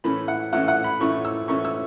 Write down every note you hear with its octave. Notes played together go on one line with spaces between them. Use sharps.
A2 E3 A3 C#4 B5
F#5
A2 E3 A3 C#4 F#5
F#5
B5
A2 E3 A3 C#4 C#6
E6
A2 E3 A3 C#4 C#6
E6